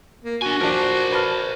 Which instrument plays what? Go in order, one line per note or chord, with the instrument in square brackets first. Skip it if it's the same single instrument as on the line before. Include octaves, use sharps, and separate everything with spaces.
[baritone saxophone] A#3
[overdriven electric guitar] D4 G#5 [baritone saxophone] F#4
[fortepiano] F3 D4 [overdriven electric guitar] A#4 C5
[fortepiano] B4 A5 F6